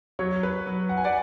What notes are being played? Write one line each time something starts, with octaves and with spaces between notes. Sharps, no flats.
F#3 C#5
B4
F#3
F#5
G#5
D5 F#5